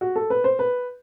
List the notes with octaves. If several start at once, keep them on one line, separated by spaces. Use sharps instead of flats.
F#4
A4
B4
C5
B4